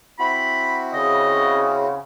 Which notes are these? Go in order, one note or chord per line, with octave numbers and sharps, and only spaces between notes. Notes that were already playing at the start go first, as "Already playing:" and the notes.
C4 E4 F#4 B5
C#3 D#5